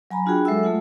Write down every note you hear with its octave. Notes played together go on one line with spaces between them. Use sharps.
F#3 G#5 A#5 B5
D4 F4 F#4 G#4 G5 B5
F#3 G#3 A4 E5 F#5 E6
A3 F4 F#5